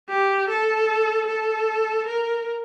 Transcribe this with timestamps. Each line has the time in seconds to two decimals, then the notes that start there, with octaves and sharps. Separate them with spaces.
0.09 G4
0.49 A4
1.28 A4
2.07 A#4